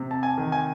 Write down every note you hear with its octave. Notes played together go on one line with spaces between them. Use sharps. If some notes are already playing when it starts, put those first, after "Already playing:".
Already playing: C3
A5
G#5
D#3
G#5